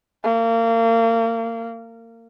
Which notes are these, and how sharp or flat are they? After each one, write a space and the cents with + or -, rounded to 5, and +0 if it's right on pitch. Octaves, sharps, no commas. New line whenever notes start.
A#3 -30